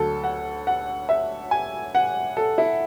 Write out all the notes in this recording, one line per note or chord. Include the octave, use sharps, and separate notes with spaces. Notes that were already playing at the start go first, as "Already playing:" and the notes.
Already playing: D2 D3 F#3 A4
F#5
F#5
E5
G#5
F#5
A4
E4